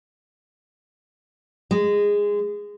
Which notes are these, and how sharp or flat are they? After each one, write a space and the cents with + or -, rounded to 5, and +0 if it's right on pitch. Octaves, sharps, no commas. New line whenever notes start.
G#3 -15